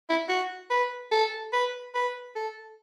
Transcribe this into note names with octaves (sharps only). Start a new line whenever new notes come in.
E4
F#4
B4
A4
B4
B4
A4